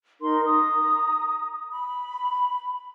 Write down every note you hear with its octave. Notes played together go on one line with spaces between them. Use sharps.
D#4 A#4 C6
A#5 D#6
B5